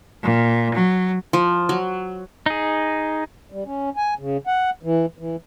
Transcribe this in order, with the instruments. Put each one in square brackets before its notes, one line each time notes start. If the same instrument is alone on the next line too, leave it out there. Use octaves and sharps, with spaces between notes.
[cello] A#2
F#3
[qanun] F3
F#3
[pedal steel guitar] D#4 G#4
[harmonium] G3
C#4
G#5
C#3
F#5
E3
E3